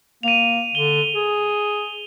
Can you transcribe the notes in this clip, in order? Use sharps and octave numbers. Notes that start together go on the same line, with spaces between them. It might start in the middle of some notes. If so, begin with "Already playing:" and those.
A#3 D#7 F7
D3 G7
G#4